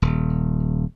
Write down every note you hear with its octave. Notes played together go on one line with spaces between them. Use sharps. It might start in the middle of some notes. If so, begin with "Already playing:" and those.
D#1